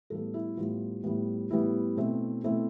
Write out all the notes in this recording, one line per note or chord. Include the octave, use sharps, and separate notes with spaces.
A2 G3 B3 A4
E4
A2 G3 B3 F4
A2 G3 B3
A2 G3 B3 E4
B2 A3 C4
B2 A3 C4 E4